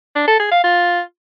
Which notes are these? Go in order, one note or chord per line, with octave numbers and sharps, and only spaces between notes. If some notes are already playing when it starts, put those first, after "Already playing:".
D4
A4
G#4
F5
F4